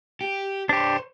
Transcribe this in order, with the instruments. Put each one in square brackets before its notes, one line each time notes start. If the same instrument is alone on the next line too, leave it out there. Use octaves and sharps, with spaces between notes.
[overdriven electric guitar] G4
[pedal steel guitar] D4 G4 [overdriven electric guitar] C5 C#5